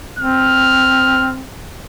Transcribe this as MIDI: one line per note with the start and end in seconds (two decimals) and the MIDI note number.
0.19 1.44 60
0.19 1.32 89